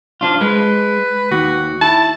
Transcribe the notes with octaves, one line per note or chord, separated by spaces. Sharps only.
F3 D4 F4
G#3 B4
D#2 F#4
E4 A5